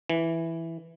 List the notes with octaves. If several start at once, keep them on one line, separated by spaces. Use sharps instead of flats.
E3